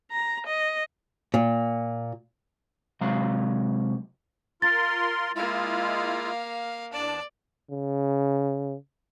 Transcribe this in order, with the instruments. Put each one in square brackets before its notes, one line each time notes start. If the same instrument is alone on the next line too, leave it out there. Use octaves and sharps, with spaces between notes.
[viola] A#5
D#5
[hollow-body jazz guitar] A#2
[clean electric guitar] C3 F#3 G#3 F5 A#5
[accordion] F4 A#4 C6 [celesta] A6
[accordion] G#3 E4 F4 [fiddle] A#3 F5
[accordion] E2 D4 A5 [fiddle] D5
[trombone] C#3